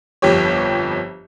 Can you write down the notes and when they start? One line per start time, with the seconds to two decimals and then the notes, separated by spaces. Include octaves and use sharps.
0.22 G1 F2 G4 C#5